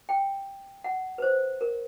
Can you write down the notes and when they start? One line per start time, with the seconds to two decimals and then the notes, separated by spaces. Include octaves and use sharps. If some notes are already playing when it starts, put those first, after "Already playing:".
0.09 G5
0.84 F#5
1.18 B4
1.22 C5
1.61 A#4